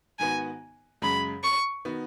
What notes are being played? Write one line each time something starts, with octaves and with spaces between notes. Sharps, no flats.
G#2 D#3 B3 F#4 G#5
F#2 C#3 G#3 B5
C#6
D#3 B3 F#4